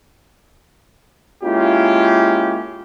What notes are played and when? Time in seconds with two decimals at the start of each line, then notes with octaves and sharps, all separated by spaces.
1.44 G#3 A#3 C#4 E4 F4 G4